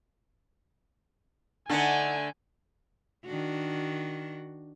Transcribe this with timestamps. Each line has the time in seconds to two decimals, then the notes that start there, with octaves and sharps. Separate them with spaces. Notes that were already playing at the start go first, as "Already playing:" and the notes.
1.70 D3 A3 D4 D#4 F#5 G#5
3.26 D#3 D4 F#4